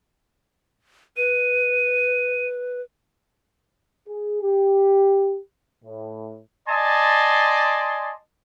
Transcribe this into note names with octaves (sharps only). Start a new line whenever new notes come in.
B4 D#7
G#4
G4
A2
D5 D#5 G#5 A5 C6